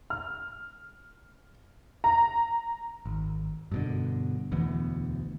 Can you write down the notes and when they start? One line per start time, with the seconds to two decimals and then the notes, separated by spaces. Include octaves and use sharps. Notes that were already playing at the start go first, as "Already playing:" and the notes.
0.10 F6
2.04 A#5
3.06 G#1
3.72 G2 B2 D3
4.52 E1 D2 E3 B3